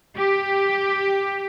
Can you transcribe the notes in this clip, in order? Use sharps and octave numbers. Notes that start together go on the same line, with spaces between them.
G4